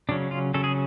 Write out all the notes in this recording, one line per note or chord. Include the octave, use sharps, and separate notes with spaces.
C#3 F#3 C#4 D4
F4
C#3 F#3 C#4 A4
G#4